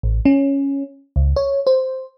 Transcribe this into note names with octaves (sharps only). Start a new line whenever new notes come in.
A1
C#4
C#2
C#5
C5